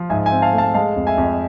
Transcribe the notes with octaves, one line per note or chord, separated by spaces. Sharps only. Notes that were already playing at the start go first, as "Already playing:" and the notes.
Already playing: F3
G#2 E5 G#5
E5 G#5
C4
F5 A5
A3
F5 A5
G#3 F5 A5
F2
E5 G#5
F2